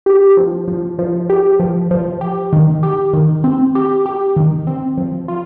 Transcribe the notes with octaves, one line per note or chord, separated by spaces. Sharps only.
G4
F3
F3
F3
G4
F3
F3
G4
D#3
G4
D#3
C4
G4
G4
D#3
C4
F3
F4